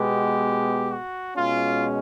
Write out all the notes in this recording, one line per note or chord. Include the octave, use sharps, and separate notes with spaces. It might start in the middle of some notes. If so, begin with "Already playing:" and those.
Already playing: B2 G#3 B3 G4
F#4
B2 G#3 C#4 F4